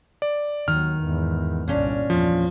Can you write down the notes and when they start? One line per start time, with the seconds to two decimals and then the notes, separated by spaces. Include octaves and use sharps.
0.22 D5
0.68 D#2 D#3 F#3 F6
1.00 E2 G#2
1.68 G1 C2 A#2 C#4 D4
2.10 E2 F3